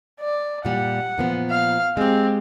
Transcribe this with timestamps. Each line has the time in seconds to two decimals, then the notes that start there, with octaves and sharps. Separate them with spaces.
0.20 D5
0.65 A#2 G3 F#5
1.18 A#2 F3 B3
1.50 F5
1.97 G#3 C4 G4